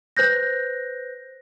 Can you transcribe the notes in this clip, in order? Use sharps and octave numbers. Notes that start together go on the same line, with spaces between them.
B4 C5 F#6 G6 A#6